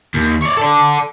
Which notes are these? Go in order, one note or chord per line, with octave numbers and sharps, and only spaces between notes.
D#2
C#5 D5
A4 D5